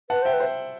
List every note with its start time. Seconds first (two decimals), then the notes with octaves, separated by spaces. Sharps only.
0.10 B4 F#5 A5
0.22 C5 E5 G5
0.33 B4
0.40 C5 E5